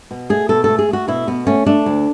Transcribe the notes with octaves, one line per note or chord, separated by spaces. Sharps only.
B2
A3 G#4
B2 A4
A3 A4
G#4
A3 F#4
B2 E4
B2 B3
A3 C#4
A3 D4
D2